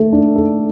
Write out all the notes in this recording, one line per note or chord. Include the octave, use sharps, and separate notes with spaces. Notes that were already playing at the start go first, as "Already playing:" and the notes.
Already playing: A3 A4
D4
A4